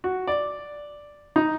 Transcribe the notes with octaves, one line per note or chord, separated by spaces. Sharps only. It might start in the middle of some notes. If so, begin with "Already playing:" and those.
F#4
D5
D#4